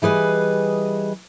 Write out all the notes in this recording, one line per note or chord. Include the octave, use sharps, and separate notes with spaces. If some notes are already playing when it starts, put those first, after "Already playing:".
E3 G3 G#4 B4 D#5